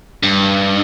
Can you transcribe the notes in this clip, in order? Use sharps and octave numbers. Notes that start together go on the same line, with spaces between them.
G2